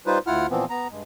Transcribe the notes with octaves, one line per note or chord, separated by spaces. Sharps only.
G3 D#4 F4 B4 C5
D2 E4 F4 F#5 F6
A#2 E3 F3 B3 C4
B3 A#5
G2 G#3